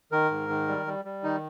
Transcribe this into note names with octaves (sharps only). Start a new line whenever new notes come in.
D#3 A#4
G#2
D#3
G3
G3
G3
D#3 D#4